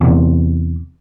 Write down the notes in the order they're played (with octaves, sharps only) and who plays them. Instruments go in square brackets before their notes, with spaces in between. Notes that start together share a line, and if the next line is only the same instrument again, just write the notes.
[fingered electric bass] E2 C3